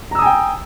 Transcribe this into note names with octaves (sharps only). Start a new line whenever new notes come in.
G5 G#5 A#5 D#6 E6